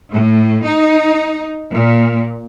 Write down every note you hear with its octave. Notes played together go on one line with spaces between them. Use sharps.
A2
D#4
A#2